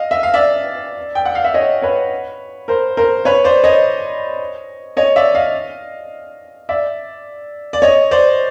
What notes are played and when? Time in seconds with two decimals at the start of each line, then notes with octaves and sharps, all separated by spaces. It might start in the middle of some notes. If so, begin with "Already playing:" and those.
Already playing: D#5 F5
0.11 E5
0.23 F5
0.34 D5 E5
1.15 G5
1.25 F#5
1.35 F5
1.44 E5
1.54 C#5 D#5
1.82 B4 C#5
2.68 A#4 C5
2.97 A#4 C5
3.25 B4 C#5
3.44 C5 D5
3.64 C#5 D#5
4.97 C#5 D#5
5.16 D5 E5
5.35 D#5 F5
6.69 D5 E5
7.73 D5
7.82 C#5 D#5
8.11 C5 D5